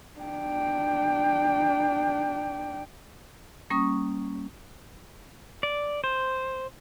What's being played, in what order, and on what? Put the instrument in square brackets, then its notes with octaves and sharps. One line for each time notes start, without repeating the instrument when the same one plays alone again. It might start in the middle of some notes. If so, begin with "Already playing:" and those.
[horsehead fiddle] D4 G5
[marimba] G3 A#3 C#4 C#6 D#6
[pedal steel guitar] D5
C5